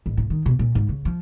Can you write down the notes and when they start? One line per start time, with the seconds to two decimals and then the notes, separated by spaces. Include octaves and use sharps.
0.06 A1
0.17 A2
0.30 D#3
0.46 B2
0.59 A#2
0.75 G#2
0.89 C#3
1.05 F3